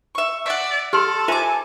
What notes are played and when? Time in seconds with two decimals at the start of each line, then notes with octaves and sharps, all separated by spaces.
0.15 E5 C#6
0.46 D5 E5 F#5
0.93 G4 A4 C#5 C6 F6
1.28 F4 C5 E5 G#5 D6